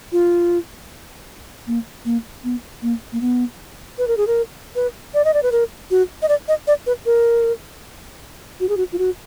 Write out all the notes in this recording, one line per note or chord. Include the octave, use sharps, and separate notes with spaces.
F4
A#3
A#3
B3
A#3
A#3
B3
B4
A#4
G#4
A#4
B4
D5
D#5
D5
B4
A#4
F#4
D#5
D5
D#5
D5
B4
A#4
F#4
G#4
F#4
F4
F#4